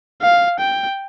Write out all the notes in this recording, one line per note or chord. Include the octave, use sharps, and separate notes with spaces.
F5
G5